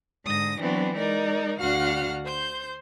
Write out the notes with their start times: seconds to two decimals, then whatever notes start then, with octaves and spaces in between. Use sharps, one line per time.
0.24 G#2 D3 D#6 A#6
0.60 E3 F#3 B3 C4 D4
0.97 G#3 D#4 A#4 D5
1.60 D2 D3 F#4 F5 F#5 F6
2.25 C5 C6 G6